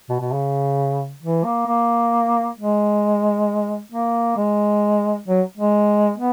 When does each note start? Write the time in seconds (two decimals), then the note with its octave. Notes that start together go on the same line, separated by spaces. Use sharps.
0.09 B2
0.20 B2
0.32 C#3
1.22 E3
1.44 A#3
1.67 A#3
2.58 G#3
3.92 A#3
4.37 G#3
5.28 F#3
5.57 G#3
6.17 B3